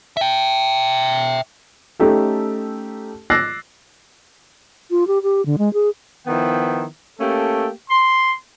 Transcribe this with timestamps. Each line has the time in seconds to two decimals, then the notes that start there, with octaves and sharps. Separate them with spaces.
0.17 E5 G5
1.99 A3 C#4 D#4 G4 A4
3.30 D6 E6 F#6 A6 A#6 C7
4.91 F4
5.07 G4
5.23 G4
5.46 D3
5.58 G#3
5.74 G#4
6.27 D#3 F3 B3 E4 G5
7.20 A3 A#3 C#4 G4 A4
7.90 C6